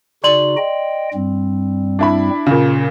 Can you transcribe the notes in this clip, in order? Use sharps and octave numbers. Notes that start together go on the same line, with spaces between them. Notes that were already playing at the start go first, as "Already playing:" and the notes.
C#3 D#4 F#4 D5 C6 F#7
D#5 G5
G2 G3 C4
D4 E4 B5
A#2 C#3